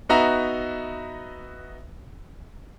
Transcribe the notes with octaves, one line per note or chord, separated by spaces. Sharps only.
B3 D#4 F#4 E5 A#5